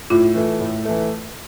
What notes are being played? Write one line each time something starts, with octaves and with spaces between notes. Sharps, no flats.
A2 F4
E3 A3
A2
E3 A3